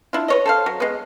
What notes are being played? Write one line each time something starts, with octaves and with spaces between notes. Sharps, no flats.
D4 E4 F4
B4 C#5 D#5
A4 C5 F5
F#3
G#3 B3